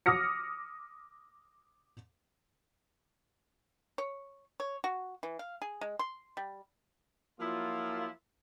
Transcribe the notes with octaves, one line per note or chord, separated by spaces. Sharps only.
D6 D#6 F6 A#6 C#7
C#5
C#5
F#4
E3
F5
G#4
G#3
C6
G3
F3 F#3 A#3 E4 F4